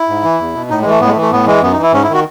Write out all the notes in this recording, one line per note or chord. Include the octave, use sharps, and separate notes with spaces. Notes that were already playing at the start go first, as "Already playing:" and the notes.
Already playing: E4
G#2
E3
E2
B2
A2 D#4
E3 G#3
A3
A2 B3
G#3
A3
E3
A3
A2 B3
E3 G#3
F#2 B3
D#4
E3
E4
G#2 C#4
E4
D#3 F#4